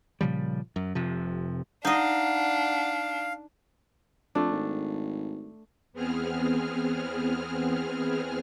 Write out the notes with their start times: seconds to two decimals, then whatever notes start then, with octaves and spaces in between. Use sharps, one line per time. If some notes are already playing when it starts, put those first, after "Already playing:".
0.21 A#2 C#3 F3 G3
0.76 F#2
0.95 F1 C3 F3
1.85 D4 D#4 D#5 F5 F#5
4.35 F2 A3 D4
4.51 G#1
5.93 E2 B3 C4 G#4 F6